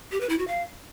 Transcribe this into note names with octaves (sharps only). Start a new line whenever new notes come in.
G4
B4
E4
F#4
F5